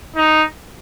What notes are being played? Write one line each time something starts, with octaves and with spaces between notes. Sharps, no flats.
D#4